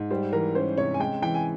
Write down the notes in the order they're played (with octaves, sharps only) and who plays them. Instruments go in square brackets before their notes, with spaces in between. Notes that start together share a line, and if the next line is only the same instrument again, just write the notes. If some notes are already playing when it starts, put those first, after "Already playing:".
Already playing: [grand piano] G#2
[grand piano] G3 [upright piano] C5
[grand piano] E3 [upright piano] A#4
[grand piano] C#4 [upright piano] C5
[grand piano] C3 [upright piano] C#5
[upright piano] G#5
[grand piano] G#3 [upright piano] G5
[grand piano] E3 [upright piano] G5
[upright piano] G#5